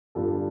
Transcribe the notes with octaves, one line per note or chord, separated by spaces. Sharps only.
G1 G2 G3 F4 A4